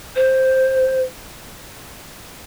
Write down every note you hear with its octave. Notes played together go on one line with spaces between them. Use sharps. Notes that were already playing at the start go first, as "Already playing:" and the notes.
C5